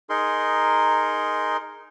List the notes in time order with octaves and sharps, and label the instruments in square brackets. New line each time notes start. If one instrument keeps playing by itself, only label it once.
[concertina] D#4 G#4 A#4 C6